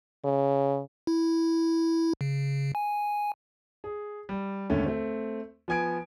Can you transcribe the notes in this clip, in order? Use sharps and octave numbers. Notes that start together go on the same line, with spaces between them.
C#3
E4
C#3
G#5
G#4
G3
D#2 G#2 D3 A3 C#4
A3 C4
F3 B3 G#5 G#6 D7